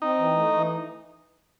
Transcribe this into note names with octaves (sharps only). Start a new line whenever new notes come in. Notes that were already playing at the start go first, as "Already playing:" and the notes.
C4 D#4
E3
A3
E3